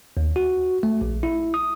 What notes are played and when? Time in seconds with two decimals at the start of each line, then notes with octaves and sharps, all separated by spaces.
0.17 D#2
0.36 F#4
0.83 A3
1.01 A#1
1.23 E4
1.54 D#6